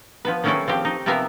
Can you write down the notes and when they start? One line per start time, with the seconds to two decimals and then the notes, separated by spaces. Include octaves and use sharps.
0.25 F3 B3 B4
0.44 D#3 F#3 C#4 E4 G#4 A4
0.68 F3 C4 G4
0.85 D#4
1.06 C3 F3 B3 A#4 E5 F5